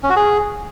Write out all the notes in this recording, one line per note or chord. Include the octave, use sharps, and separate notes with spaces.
C#4
F#4
G#4